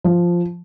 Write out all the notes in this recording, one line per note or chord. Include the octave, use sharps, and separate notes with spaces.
F3